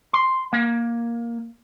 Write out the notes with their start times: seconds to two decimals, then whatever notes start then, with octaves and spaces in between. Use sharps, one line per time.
0.13 C6
0.53 A#3